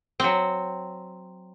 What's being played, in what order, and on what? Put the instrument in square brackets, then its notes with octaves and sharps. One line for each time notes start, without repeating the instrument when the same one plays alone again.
[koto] F#3 C4